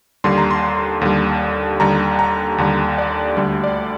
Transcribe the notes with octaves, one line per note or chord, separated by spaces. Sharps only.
D#2 D3 G3 C6
A#5
C6
D#2 D3 G3
D#2 D3 G3 A#5
A#5
D#2 D3 G3
D5
D2 D3 G3
D5